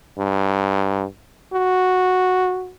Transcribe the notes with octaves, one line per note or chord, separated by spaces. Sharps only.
G2
F#4